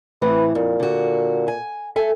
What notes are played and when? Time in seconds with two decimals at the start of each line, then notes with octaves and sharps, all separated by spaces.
0.22 A2 E3 C4 B4
0.55 F2 A#2
0.80 D3 F#4
1.48 G#5
1.96 A4 E5 G#5